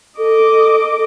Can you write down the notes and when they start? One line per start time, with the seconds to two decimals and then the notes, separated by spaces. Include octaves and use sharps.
0.18 A4 D#5 D6